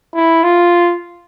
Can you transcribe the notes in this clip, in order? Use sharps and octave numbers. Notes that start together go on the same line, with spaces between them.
E4
F4